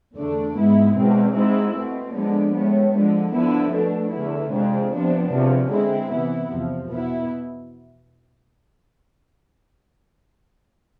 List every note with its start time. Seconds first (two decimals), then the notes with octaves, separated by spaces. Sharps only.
0.14 E2 D3 A3 D4
0.54 G#2 G#3 B3 E4
0.95 E2 B2 G#3 C4
1.33 G#2 G#3 C4 E4
1.74 B2 A3 C4
2.12 D3 F3 G#3 B3 D4
2.53 A2 G#3 B3
2.93 D3 F3 G#3
3.32 D3 F3 B3 E4
3.72 B2 A3 D4
4.11 E2 D3 A3 E4
4.50 F2 C3 G#3 D4
4.90 C3 F3 B3 D4
5.30 E2 C3 F3
5.70 D3 G#3 C4 E4
6.10 C3 E3 B3 E4
6.49 E2 C3 F3
6.89 B2 B3 E4